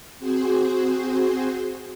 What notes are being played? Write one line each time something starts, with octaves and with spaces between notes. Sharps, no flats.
C4 F#4 G#4 C5